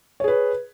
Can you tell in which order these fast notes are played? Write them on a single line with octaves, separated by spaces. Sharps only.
C#5 G#4 B4